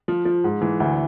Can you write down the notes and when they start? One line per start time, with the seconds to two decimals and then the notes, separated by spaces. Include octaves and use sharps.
0.08 F3
0.25 F3
0.44 G#2
0.61 E3
0.80 D2